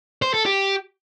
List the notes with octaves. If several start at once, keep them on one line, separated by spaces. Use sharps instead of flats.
C5
A4
G4